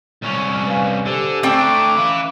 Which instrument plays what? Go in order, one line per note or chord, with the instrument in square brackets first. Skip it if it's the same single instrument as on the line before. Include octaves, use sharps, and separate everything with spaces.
[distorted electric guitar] C2 C#4
[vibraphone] B4 F5 G#5
[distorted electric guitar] D3 [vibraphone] G4 C5 G#5
[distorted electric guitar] A3 D4 [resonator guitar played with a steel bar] C4 G5 [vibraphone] A#5 [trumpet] D6
[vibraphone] C#4 F5 [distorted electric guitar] E4 B4